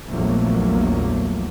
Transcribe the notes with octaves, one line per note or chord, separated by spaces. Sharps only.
A#1 E2 F3 F#3 A3 A#3